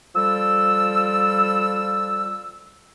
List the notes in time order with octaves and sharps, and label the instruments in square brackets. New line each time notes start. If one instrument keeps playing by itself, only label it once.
[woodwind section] F3 G3 A4 E6